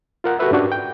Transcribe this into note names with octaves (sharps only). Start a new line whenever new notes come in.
F4 A#4 F#5
F#4 G4 A4 B4 E5
G#2 C#4 D4 F#4 G4
G5